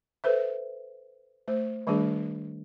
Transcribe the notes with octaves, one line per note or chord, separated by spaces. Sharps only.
A4 B4 C5 E5
A3 C5
D#3 G3 A3 D4 G#4